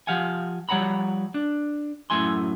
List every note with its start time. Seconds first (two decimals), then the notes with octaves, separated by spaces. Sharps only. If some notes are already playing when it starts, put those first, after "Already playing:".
0.07 F3 G4 F5 F#5 G#5
0.69 F3 G3 C#5 F#5 A#5 B5
1.34 D4
2.10 F#2 A2 A3 E4 G#5 C6